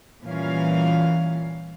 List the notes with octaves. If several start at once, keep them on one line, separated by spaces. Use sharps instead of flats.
A#2 E3 G3 C#4 F5